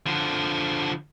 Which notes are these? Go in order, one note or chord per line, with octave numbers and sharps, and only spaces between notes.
D3 F3